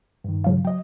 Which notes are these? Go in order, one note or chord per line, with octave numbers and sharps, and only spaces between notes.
G2 D#3
C#3 F#3 F5
F#3 D#5 G5